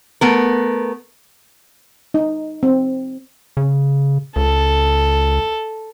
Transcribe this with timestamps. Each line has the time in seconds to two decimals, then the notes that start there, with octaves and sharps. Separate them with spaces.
0.21 A3 B3 A#4
2.14 D#4
2.63 C4
3.57 C#3
4.36 C#2 A4